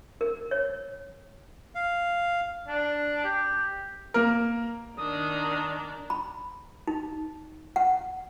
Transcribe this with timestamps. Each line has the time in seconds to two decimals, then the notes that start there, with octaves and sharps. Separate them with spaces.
0.21 A#4
0.51 C#5
1.75 F5
2.67 D4
3.24 G4
4.14 A#3 A#4
4.98 D#3 D4 D#6
6.10 B5
6.87 D#4
7.76 F#5